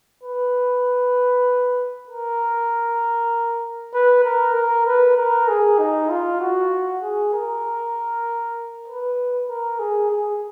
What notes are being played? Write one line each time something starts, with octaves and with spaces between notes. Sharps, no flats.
B4
A#4
B4
A#4
A#4
B4
A#4
G#4
D#4
F4
F#4
G#4
A#4
B4
A#4
G#4
G#4